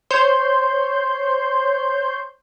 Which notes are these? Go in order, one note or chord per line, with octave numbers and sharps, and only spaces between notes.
C5 C#5 C6 G6